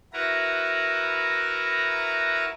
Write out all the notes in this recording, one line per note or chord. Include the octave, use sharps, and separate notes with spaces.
E4 F#4 A#4 B4 A#5